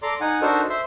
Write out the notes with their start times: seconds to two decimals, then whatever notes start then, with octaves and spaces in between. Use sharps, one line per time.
0.03 A4 D5 A#5 C6 D6
0.21 D#4 F#5 G#5
0.42 D4 D#4 F#4 A4 A#4 C5
0.70 C5 E5 C6